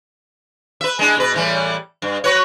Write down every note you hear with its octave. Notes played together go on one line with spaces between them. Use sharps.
B4 E5
G#3 D4 E4
B2 B4
A2 E3 G3
G2
F#4 B4 C#5